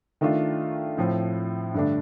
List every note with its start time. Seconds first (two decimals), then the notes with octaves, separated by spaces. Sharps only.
0.21 D#3 A3 D4 F4
0.97 A2 F3 C4
1.74 G2 D3 A3 D4